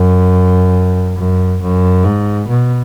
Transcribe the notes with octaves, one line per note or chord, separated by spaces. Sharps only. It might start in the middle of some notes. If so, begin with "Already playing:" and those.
Already playing: F#2
F#2
F#2
G#2
B2